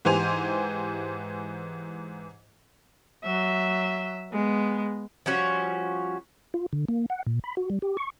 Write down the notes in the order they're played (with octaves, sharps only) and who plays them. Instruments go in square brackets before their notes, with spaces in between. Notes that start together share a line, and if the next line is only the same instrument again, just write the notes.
[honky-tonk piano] G#2 E3 G4 C5 G#5 F7
[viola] F#3 E5
G#3 B3
[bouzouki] F3 G3 C#4 F#4
[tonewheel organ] F4
D3
A#3
F#5
A#2
B5
F#4
G3
G4
C#6